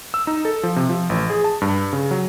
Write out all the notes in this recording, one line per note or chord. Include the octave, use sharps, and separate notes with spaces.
E6
D#4
A4
F3
C3
F3
A1
G#4
A5
G2
C#3
F#3